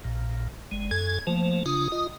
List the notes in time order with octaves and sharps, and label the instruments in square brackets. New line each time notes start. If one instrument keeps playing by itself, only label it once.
[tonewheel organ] A#1 A#2
G1 G#3
[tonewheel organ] F#2 A4 G#5 [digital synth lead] G#6
[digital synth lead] F3 [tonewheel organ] A3 A#3
[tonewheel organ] C#3 D4 F4 [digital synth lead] D#6
[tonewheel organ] F4 D#5